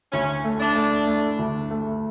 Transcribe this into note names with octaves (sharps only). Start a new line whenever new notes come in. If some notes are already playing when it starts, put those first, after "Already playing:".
D2 C#4
A3
D4
A3
A3
D2
A3